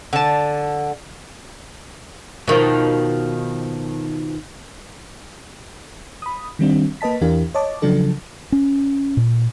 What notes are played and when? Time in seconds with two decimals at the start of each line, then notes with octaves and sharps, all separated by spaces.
0.13 D3 A5
2.48 B2 D#3 F3
6.22 B5 D#6
6.59 D#3 G3 C4 D4
7.01 A#3 B4 D#5 A5 B6
7.21 E2 E3 D4 G4 A#4 F5
7.55 C#5 D#5 A5 D6
7.82 C#3 F3 F#3 D4 A4
8.52 C#4
9.17 A#2